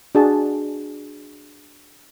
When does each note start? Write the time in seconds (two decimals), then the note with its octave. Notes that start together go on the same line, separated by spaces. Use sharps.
0.15 D4 F#4 G#4 A5